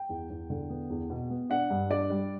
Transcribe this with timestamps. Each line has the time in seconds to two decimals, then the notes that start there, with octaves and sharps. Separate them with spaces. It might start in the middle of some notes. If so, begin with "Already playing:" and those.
Already playing: G5
0.09 E2
0.30 E2
0.50 D3
0.70 B3
0.90 E2
1.10 B2
1.30 B3
1.50 D4 F#5
1.70 G2
1.90 D4 D5
2.10 G3